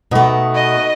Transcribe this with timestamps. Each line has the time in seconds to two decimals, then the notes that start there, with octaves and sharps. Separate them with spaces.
0.11 B2 A3 B3 D#4 F#4
0.56 D#5